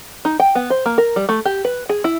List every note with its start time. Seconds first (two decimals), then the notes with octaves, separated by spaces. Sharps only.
0.25 D#4
0.40 G5
0.55 B3
0.70 C5
0.86 A#3
0.98 A#4
1.16 G3
1.29 A3
1.45 G4
1.65 B4
1.89 G#4
2.04 E4